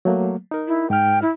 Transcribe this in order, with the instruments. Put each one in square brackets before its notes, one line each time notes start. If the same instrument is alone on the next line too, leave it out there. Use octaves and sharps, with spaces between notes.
[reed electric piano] F#3 A3 A#3
D#4 A#4
[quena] E4
[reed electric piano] G#2 F6 [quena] G5
[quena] E4